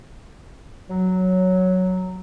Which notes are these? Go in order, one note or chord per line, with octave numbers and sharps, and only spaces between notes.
F#3